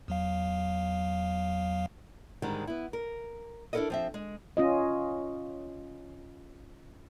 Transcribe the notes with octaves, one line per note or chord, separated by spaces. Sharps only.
E2 F#3 F5
G#2 D3 D#3 G3 G#3
B3 E4
A#4
D4 E4 F4 A4 A#4 D#5
F3 C4 E5
G#3
C#4 F4 D#5